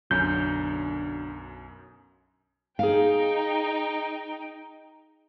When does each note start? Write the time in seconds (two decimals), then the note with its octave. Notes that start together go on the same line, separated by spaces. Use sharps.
0.11 B1 F#2 D3 C#4 G6
2.79 D#4 G#4 F5 G5